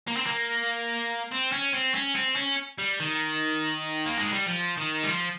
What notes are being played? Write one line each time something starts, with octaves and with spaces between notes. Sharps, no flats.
A#3
C4
A#3
C4
C#4
C4
C#4
C4
C#4
G3
D#3
A#3
G#3
G3
F3
D#3
G3
F3